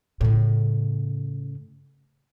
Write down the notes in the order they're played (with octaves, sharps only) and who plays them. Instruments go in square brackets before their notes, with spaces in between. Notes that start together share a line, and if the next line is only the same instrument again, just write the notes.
[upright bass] A2 C#3